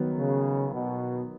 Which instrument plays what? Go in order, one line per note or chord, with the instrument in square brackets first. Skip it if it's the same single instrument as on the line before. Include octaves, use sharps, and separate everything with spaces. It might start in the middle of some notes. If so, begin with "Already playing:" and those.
Already playing: [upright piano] D#3 F#3 B3
[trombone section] C#3
B2